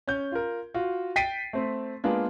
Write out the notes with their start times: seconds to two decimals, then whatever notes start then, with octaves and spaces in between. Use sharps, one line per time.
0.07 C#4 G6
0.32 F4 A#4
0.74 F4 F#4
1.16 G5 A6 B6 C7 D7 D#7
1.53 A3 C4
2.04 G#3 A#3 B3 D4 F4